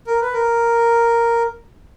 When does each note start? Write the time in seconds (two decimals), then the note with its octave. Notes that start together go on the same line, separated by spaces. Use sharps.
0.07 A#4
0.21 B4
0.33 A#4